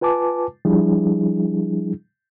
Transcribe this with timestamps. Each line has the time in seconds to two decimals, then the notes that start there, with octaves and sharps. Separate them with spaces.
0.01 F4 B4 G#5 A5 D6
0.65 F3 G3 D4 E4 G#4